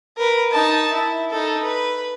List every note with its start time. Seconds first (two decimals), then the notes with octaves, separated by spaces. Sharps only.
0.17 A#4 B4
0.52 D#4 A5
0.93 E4
1.31 D#4 A4
1.63 B4